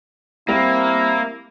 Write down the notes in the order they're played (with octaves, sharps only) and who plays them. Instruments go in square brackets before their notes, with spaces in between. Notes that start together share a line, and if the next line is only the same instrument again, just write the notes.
[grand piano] G3 C4 [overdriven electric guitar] A#3 [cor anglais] E4